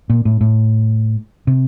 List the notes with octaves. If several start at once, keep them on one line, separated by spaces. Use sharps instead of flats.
A#2
A2
A2
C3